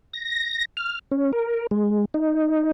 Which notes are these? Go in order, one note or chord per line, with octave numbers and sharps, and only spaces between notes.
A#6
F6
C#4
A#4
G#3
D#4